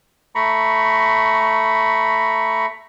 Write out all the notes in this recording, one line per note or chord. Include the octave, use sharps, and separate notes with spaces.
A3 A#5 B5 C#6